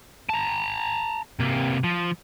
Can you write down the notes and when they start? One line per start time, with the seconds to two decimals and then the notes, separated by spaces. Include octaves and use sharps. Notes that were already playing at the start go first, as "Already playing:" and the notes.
0.30 A5 A#5
1.40 C3 A#3
1.84 F3